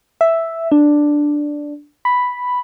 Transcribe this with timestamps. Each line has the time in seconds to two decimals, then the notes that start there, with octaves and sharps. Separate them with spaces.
0.21 E5
0.72 D4
2.05 B5